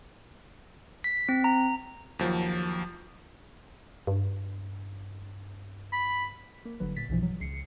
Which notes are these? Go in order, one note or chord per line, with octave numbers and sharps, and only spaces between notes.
B6
C4
A#5
D#2 F3 F#3
G2
B5
A#3
G1 D3 F#3 B4
A#2 A6 B6
B1 G2 B2 E3 F3
F#3
C#2 C7 C#7